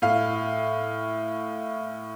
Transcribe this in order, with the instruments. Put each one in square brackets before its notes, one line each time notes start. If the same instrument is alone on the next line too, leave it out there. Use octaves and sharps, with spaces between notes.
[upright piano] A2 F5